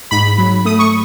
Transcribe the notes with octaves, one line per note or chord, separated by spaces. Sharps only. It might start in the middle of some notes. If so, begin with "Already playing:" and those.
G#2 B5
F#3
A3 D#6
C#6